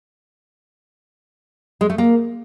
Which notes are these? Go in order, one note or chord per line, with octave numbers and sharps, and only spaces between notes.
G#3
A3
A#3